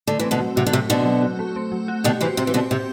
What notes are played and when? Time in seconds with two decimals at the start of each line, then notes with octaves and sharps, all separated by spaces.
0.07 D3 A3
0.20 E3 C4
0.31 B2 D3
0.40 F#3
0.56 C3 F#4
0.67 D3
0.73 C3 A3
0.90 B2 D3 C4
1.06 F#3
1.22 F#4
1.39 A3
1.56 C4
1.72 F#3
1.88 F#4
2.04 B2 D3 G4
2.21 C3 E3 C5
2.37 C3 C4
2.47 E3
2.54 B2 D3 C4
2.71 C3 G4